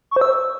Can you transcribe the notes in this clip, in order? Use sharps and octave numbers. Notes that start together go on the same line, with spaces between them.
C#6
C5
E6